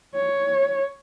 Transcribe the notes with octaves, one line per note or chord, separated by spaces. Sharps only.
C#5